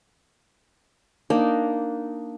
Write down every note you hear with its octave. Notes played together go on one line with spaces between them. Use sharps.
A#3 D4 D#4